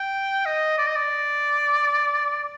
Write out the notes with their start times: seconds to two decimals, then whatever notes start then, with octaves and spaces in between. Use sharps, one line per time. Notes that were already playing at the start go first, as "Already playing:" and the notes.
Already playing: G5
0.46 D#5
0.78 D5
0.87 D#5
0.96 D5